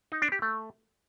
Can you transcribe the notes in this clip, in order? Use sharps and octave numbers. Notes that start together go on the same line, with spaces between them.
D#4
D4
G4
A3